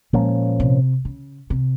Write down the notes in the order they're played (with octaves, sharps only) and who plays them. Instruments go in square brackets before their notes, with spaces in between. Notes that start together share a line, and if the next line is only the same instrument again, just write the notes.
[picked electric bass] A#2 F3 A#3 C#4 [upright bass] G#3
[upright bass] C3
C#3
C3